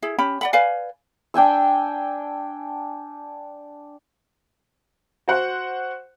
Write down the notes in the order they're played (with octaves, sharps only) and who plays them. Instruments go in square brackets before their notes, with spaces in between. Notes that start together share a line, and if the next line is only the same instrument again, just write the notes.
[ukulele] E4 G#4
C#4 G4 B5
D5 F#5 B5
B4 D5 F5 G#5
[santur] D4 G5 G#5 E6
[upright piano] F#4 C5 F#5